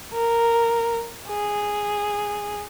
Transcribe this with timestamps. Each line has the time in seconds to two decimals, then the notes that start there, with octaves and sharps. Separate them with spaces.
0.13 A#4
1.28 G#4